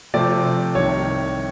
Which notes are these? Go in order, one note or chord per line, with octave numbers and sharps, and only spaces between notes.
C3 F3 A3 C4 D5
C2 C3 D#3 C#5